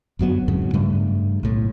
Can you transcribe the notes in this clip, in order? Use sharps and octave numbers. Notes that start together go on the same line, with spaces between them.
G1 F#2 F#3 B3
F2 G#2 C#3 F#3
G2 C#3 G3 A3
B1 A2